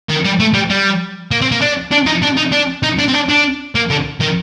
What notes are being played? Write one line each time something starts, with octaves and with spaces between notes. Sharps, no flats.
D#3
G3
A3
G3
G3
A#3
C4
A#3
D4
D4
D#4
D4
D#4
D4
D#4
D4
C4
D4
D4
A#3
D3
D#3